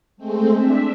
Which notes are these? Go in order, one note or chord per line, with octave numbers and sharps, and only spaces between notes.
G#3 A3 C4
D4 E5